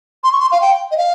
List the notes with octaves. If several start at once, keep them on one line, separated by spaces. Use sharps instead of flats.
C6
C#6
C6
F5
G5
D#5
F5